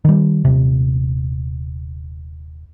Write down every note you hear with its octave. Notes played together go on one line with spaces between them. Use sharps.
D#3 G3
D#1 C3